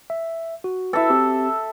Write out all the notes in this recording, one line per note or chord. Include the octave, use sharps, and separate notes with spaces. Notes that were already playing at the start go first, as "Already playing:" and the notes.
E5
F#4
E4 A4 B4 E5
C4 G4